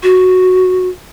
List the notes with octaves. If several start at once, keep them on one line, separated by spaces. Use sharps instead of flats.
F#4